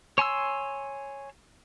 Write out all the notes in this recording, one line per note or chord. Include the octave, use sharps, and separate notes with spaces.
C#5 G#5 C6 E6